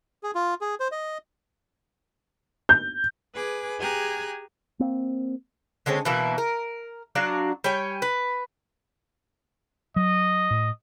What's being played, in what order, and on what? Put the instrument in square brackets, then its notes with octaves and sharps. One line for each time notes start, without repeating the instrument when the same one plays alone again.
[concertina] G#4
F4
G#4
C5
D#5
[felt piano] G6
[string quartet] G#4 B4 G#5 D6
G4 G#4 G#5 A#5 F#6
[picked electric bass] A#3 C4
[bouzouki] D3 G#3 C4 C#4
B2 E3 A#3 E4
A#4
F#3 D4 F#4 F5
G3 C#5 G5 G#5
B4
[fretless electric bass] F#3 [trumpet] D#5
[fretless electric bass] A2